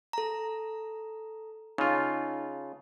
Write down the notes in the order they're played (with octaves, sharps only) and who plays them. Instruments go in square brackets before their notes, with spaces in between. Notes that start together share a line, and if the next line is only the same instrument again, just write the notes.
[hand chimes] A4 A#5
[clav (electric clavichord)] C#3 F4 [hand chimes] D#4